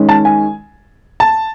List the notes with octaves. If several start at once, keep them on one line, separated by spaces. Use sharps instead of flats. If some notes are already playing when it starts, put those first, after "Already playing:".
Already playing: D#3 G#3 C#4
A5
G#5
A5